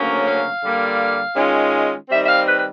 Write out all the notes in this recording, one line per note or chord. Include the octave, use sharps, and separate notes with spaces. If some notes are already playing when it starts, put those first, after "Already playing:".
Already playing: D2 C#3 F#3 A#3 C#4
F5
D3 G3 A#3
D#3 G#3 C#4 F4
D#3 G3 C4 E5
E5
F5
B4
B4